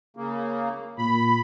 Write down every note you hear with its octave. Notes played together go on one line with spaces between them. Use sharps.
C#3 A#3
A#2 B5